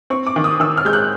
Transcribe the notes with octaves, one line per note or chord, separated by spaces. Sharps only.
C4 C#6
D6
D#3
D#6
D#3 E6
F6
G#3 G6
F#6